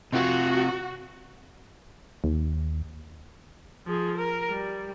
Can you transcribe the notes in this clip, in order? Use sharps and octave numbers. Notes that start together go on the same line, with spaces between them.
C3 F4 F#4
D#2
F3 G#4
A#4
G3